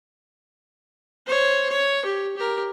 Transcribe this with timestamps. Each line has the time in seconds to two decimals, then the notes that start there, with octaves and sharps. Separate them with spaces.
1.26 C5 C#5
1.70 C#5
2.05 G4
2.36 G4 A#4